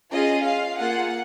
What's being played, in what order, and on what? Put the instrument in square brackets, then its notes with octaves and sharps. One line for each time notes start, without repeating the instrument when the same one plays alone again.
[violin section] C#4 F4 G#4 D#5
F5
A#3 F4 G#4 F#5